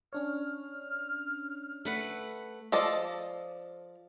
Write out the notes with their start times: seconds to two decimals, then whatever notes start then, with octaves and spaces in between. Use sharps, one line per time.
0.13 C#4 D4 C#5 F6
1.85 A3 B4 F#5
2.72 F3 A4 D5 D#5